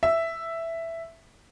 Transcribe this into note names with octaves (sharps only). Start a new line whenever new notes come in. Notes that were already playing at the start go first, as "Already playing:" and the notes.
E5